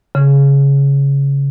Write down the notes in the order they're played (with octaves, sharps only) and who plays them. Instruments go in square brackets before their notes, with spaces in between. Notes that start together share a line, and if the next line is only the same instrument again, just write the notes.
[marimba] C#3